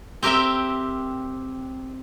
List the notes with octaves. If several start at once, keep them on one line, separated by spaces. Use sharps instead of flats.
C4 G4 A#4 E5 G5